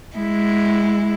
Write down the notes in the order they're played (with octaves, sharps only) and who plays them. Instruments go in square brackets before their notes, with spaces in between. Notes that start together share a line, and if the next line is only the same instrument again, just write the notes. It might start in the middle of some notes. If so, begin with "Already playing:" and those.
[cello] G#3 E4